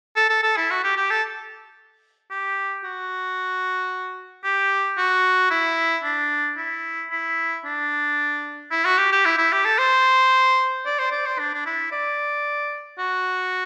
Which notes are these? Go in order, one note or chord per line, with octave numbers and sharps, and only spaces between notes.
A4
A4
A4
E4
F#4
G4
G4
A4
G4
F#4
G4
F#4
E4
D4
E4
E4
D4
E4
F#4
G4
G4
E4
E4
G4
A4
C5
D5
C5
D5
C5
D4
D4
E4
D5
F#4